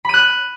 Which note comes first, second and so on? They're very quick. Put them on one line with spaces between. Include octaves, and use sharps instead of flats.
B5 D#7 F#6